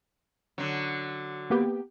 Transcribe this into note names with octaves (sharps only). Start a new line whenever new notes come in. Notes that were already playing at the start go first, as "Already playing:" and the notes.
D3 F#3
A#3 B3 G4